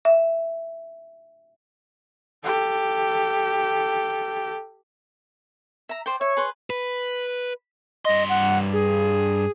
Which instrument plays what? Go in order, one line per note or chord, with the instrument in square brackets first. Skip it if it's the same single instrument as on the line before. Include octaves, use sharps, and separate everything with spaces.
[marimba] E5
[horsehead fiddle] G4 A4
[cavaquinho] E5 A#5
C5 D5 G5
[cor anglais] C#5 [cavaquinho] E5
[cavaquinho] G#4 B4 C6
[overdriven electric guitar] B4
[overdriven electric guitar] G2 C6 [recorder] D#5
[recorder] F#5
G#4